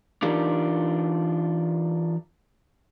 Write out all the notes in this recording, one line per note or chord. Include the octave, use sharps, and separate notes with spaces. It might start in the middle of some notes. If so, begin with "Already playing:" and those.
E3 D4 D#4 F4 G4 A#4